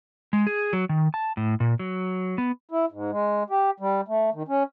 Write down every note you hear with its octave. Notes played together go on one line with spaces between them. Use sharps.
G#3
G#4
F#3
D#3
A5
A2
A#2
F#3
B3
E4
G#2
G#3
G4
G3
A3
D#3
C#4